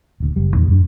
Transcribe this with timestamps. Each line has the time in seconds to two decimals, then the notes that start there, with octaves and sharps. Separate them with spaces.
0.20 D#1 D2
0.36 F#1 G3
0.53 E2 A#2 D#3 G3
0.69 F#2 G3 D4